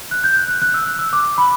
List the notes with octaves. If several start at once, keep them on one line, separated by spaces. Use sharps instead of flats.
F#6
G6
F#6
F#6
F#6
E6
F#6
E6
D6
B5